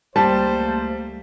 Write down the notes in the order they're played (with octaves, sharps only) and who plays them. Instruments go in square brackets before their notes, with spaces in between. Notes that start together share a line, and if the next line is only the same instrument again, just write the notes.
[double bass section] C#2 A3 A#3 [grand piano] G3 [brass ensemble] C5 [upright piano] A5